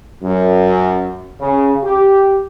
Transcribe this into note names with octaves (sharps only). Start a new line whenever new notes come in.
F#2
C#3
G4